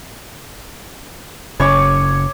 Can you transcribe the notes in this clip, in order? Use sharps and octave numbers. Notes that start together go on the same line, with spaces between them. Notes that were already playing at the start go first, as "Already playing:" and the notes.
F#1 C#3 C#4 C#5 C#6 D6